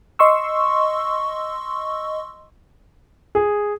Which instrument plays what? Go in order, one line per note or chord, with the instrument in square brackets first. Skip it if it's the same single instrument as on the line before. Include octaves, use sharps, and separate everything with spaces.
[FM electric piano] D#5 C6 C#6 E6
[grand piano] G#4